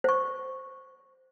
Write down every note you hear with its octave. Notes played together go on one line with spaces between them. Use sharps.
C5 C#6